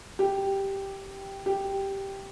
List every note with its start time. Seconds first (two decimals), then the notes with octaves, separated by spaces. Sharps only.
0.19 G4
1.46 G4